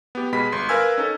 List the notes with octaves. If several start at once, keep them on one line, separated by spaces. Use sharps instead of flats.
B3 G4
B2 G#3 B5 B6
G1 C6
A#4 B4 F5 G#5 E6 G#6
C#4 D#4 A4